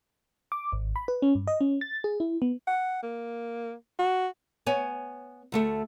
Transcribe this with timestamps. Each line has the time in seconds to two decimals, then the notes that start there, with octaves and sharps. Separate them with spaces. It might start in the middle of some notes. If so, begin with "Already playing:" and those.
0.52 D6
0.72 G#1
0.96 B5
1.08 B4
1.22 C#4
1.35 G2
1.47 D#5
1.61 C#4
1.81 A6
2.04 G#4
2.20 E4
2.42 B3
2.67 F#5
3.03 A#3
3.99 F#4
4.66 B3 C#5 G#5
5.52 D2 A3 A4